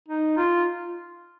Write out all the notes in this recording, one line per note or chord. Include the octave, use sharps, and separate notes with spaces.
D#4
F4